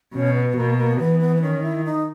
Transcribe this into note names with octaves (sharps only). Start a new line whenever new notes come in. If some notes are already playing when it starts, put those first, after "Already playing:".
B2 C#4
B3
B2 A#3
A#3
E3 B3
B3
B3
D#3 C#4
E4
D#4